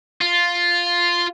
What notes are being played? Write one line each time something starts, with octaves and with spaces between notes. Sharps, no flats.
F4